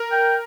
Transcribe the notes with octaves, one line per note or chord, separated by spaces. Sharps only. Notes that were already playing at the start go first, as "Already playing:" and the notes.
Already playing: A#4
G5